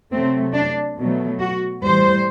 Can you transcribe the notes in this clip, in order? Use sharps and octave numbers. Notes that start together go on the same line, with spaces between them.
C3 F#3 A3 C4
D4
B2 F#3 A3
F#4
A2 E3 G3 C5